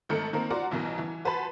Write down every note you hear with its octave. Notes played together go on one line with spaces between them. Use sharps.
G#1 D#3 A3 A4 A#5 C#7
D#3 A#3 C4 A#4
F4 F#4 A#4 D5 F#5
A1 B2 E3 A#4 A#5
E3
F#4 B4 C5 G#5 A5 B5